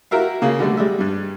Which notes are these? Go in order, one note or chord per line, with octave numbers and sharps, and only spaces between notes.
E4 F#4 G4 A#4 E5 F5
C#3 A#3
B2 D3 F#3 G3 A3
G3 G#3 E5
G2 G3